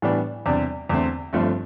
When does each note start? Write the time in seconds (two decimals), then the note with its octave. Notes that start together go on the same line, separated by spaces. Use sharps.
0.02 A2 E3 G3 B3 D4
0.46 E2 C3 G3 D4
0.89 E2 D3 A3 C4
1.33 G1 G2 F3 A3 C4